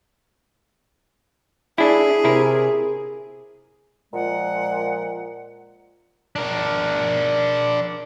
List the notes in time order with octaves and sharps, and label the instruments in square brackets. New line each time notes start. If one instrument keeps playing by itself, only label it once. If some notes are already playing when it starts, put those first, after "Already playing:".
[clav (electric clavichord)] D4 E4 [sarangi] G#4
[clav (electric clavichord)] C3 E4 A#4
[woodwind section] A#2 F3 G#3 F#5
[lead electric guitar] D4 A#4